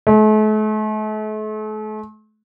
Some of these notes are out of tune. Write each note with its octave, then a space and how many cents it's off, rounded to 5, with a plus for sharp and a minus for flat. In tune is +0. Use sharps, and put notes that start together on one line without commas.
A3 -40